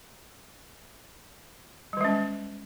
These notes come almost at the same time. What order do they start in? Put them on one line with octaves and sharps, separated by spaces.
G3 D#3 G#3 C#4